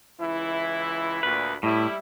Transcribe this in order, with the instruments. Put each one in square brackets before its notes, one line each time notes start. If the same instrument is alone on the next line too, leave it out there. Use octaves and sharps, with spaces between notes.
[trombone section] C#2 E3 E4
[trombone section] D2 A#2 [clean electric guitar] B4
[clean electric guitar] A2 [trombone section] G3 E4